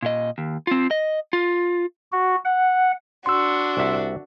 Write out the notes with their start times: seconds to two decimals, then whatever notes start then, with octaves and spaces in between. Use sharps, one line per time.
0.02 A#2 D#5
0.38 D#2
0.67 C4 F4
0.91 D#5
1.33 F4
2.12 F#4
2.45 F#5
3.26 D4 F#4 C6 E6
3.77 C2 E5